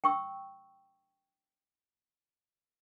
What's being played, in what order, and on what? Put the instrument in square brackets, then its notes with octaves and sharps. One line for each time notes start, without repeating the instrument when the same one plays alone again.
[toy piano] G5 C#6 E6